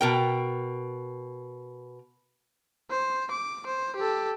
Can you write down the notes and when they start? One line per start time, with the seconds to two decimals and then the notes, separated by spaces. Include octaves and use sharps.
0.01 B2 A#4 G5
2.91 C5
3.31 D6
3.67 C5
3.96 G4 A4